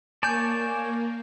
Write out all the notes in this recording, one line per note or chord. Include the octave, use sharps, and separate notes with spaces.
A#3 C#5 D5 G#5 A5 G6